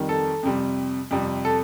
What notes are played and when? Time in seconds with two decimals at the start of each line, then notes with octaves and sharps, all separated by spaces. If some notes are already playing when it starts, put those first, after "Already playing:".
Already playing: F2 D#3 G3
0.09 A4
0.43 F2 C3 G3
1.11 F2 C3 G3
1.45 A4